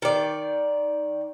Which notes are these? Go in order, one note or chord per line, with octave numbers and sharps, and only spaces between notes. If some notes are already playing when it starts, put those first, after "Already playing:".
D#3 D5